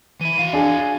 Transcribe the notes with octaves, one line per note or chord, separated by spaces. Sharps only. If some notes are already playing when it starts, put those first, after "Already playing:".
E3 E4 D#7
F#4 F5
D4 G#4 G#5